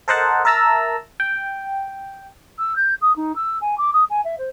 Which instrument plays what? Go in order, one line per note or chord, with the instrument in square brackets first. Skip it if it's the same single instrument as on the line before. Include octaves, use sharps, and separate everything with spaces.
[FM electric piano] A4 A#4 C5 D#5 F#5 A5
A#4 E5 A5 A#5 E6
G5
[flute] E6
G6
D#6
D#4
E6
G#5
D6
D#6
G#5
E5
C5